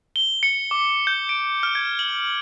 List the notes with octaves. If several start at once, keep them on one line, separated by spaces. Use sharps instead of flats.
G7
C#7
D6
G6
D7
F6
G#6
F#7